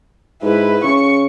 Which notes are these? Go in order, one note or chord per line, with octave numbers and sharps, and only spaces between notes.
G#2 E4 B4
C#3 C#6